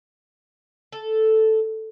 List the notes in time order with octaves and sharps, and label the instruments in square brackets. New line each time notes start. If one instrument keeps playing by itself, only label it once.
[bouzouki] A4